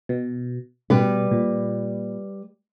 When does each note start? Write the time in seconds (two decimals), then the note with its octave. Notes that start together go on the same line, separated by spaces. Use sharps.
0.09 B2
0.90 B2 G3 B4
1.31 A#2